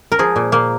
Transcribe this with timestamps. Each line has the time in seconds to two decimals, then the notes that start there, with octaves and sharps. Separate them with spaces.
0.12 A#4
0.19 F3 G#4
0.36 A#2
0.52 A#2 A#3